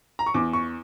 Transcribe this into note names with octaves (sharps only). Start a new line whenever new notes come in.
A#5
C#6
E2 D6
C#6